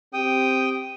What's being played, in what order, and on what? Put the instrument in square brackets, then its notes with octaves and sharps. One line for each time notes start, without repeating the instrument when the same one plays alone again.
[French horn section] C4 G4 [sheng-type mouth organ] G5 D#6